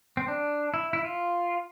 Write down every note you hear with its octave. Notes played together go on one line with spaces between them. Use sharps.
C4
D4
E4
E4
F4